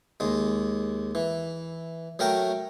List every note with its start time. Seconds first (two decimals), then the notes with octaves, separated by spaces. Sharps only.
0.20 D#2 G#3
1.15 E3
2.19 F#3 A3 A#4 G5 D6